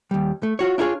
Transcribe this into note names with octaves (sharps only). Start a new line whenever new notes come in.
D#2 G3
A3
F4 F#4 C#5
D4 E4 F4 G#4 C#5